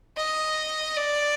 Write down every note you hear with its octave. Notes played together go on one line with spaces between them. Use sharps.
D#5
D5